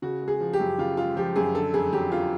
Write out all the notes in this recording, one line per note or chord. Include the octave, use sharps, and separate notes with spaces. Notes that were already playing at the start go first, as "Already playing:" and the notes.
C#3 F#4
G#3
G#4
F3
G4
F#2
C#3 F4
G#3 F4
F3 G4
F#2 G#4
D3 A4
F2 G#4
F#3 G4
F2 F4